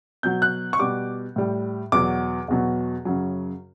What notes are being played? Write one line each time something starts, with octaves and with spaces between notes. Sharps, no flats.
B2 F#3 G6
F#6
C#6
B2 G3 D6
A2 G3
E2 B2 F#3 D6
E2 B2 F#3
F#2 C#3 F#3